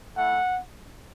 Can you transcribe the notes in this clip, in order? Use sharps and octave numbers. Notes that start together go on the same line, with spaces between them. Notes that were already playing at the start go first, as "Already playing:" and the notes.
A3 E4 F#5